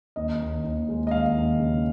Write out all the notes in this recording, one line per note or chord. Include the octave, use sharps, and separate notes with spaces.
D#2 D#5
D#2
D#2
G#3
D#5
D#2 F5
D#2
C#3